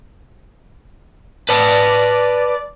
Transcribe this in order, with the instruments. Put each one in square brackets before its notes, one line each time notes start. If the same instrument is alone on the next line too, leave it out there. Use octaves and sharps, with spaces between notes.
[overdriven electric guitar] B4 A5 [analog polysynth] D5